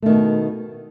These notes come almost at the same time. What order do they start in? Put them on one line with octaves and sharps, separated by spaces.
A3 D#3 B2